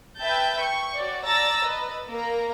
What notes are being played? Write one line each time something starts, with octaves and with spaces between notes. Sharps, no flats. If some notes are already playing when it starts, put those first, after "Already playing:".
B4 E5 G5 A5 G6
C#6
F#4 C#5 D5
D5 A5 A#5 E6 A6 A#6
B4 D#5
A#3 A#4 A#5